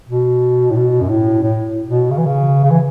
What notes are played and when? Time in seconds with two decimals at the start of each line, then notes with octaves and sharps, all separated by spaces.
0.09 B2
0.71 A2
0.76 B2
1.01 F#2
1.09 A2
1.43 A2
1.88 B2
2.11 C#3
2.18 E3
2.26 C#3
2.64 C#3
2.71 E3